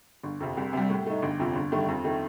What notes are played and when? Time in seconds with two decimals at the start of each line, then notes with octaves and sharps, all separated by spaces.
0.23 G1
0.40 F2 C3
0.57 C2
0.73 C3 G3
0.90 A2
1.06 A3 D#4
1.22 G1
1.39 F2 C3 F3
1.55 G1
1.72 G2 D#3 A3
1.88 F2
2.04 D#3 A3